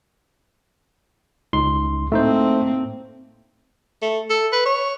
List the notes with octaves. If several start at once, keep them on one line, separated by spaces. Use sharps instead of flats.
C#2 D#4 C6
A2 A3 A#3 C4 D#4 C5
A3
A4
B4
C#5